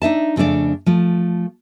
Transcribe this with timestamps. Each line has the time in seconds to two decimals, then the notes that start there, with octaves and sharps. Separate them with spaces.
0.02 D4 D#4 E5 A5
0.36 F2 C#3 A3 D4 D5
0.86 F3 A3